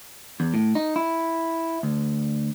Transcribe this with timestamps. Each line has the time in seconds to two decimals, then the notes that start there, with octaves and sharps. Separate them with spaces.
0.40 E2
0.54 A2
0.75 D#4
0.96 E4
1.83 D2